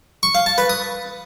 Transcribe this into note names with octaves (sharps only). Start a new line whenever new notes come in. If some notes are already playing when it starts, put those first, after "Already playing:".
C#6
F5
A5
B4
D#6